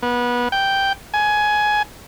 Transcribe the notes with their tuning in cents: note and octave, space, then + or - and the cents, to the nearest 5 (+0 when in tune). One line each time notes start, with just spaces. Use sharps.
B3 -25
G5 +0
G#5 +15